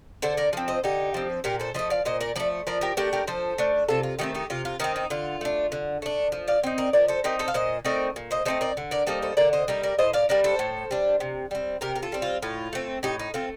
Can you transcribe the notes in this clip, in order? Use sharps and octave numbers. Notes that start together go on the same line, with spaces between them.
D3 A4 C5
A#4 D5
F3 C4
C5 D#5
D3 D#4 G4
F3 C4
A#2 G4 A#4
A4 C5
F3 A3 C5 D#5
D5 F5
A#2 C5 D#5
A#4 D5
F3 A3 A#4 D5
F3 A#4 D5
G4 A#4
A3 D4 G4 A#4
G4 A#4
F3 A4 C5
A3 D4
C3 F4 A4
F4
D#3 A3 C4 D#4 G4
D#4 G4
C3 F4
F4
D#3 A3 C4 D#4
D#4
D3 F4
A3 D4
D3
A3 D4
F3
D5 F5
C4 D#4
A#4 D5
F3 A#4 D5
A4 C5
C4 D#4 G4 A#4
A4 C5
F5
A#2 C5 D#5
A3 C4 D#4 A#4 D5
A#2
C5 D#5
A3 C4 D#4 A4 C5
A#4 D5
D3
A#4 D5
G3 A#3 D#4 A4 C5
A4 C5
D3 A#4 D5
C5 D#5
G3 A#3 D#4
A#4 D5
A2 C5 D#5
D5 F5
G3 D4 A#4 D5
A4 C5
A2
G3 D4
C3
G3 C4
C3 G4 A#4
A#4
F4 A4
G3 C4
F4
A2 F4
A3 C4
A2 D#4 G4
D#4
A3 C4 F4